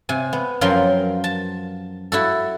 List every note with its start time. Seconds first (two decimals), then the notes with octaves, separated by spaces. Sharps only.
0.09 C3 G#5
0.33 B3
0.61 F#2 F3 F#3 A#4 G5 C6
1.24 A5
2.12 E4 F#4 A4